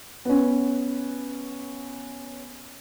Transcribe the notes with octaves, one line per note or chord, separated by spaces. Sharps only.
B3 C#4